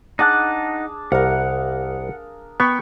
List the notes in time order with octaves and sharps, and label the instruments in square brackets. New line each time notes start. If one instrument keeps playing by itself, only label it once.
[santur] D4 G#4 A5 [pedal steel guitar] D#4 F#5 F#6
[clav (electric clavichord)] C2 [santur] A#4 F5 [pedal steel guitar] F#5
[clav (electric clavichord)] B3 [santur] G5 B5 C#6